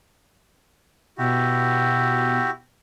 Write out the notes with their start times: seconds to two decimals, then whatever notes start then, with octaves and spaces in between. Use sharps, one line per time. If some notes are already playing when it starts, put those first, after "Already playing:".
1.18 B2 E4 F#4 G4